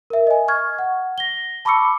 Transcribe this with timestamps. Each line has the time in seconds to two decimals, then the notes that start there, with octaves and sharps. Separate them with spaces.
0.10 A#4 E5
0.27 D#5 G#5
0.48 C#6 F6 G#6
0.79 F#5
1.18 A#6 G7
1.65 A5 B5 C#6 D6 E6 C#7